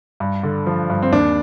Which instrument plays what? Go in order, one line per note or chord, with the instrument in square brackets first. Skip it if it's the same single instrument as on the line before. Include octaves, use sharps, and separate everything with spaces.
[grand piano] G2
D3
F3
G2
C4
D#2 D4